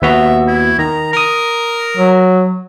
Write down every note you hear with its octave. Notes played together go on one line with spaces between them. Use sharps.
D#2 B3 F#4 E5
E4
D#3 A#5
A#4 A#5 D#6
F#3